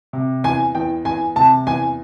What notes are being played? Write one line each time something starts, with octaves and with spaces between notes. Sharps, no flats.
C3
E2 G#5
E2 G5
E2 G#5
C3 A5
E2 G#5